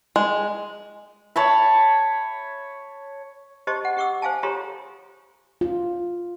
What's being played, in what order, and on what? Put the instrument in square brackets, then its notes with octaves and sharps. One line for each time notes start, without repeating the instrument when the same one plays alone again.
[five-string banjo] G#3
[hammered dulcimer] C#5 A5 B5
[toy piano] G4 C5 D#5 A5 C6 C#6
F#5
G4 F#5 C#6 D6 E6
C5 F5 G#5 A5
F4 G4 A4 C#5 A#5 C6
[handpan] F4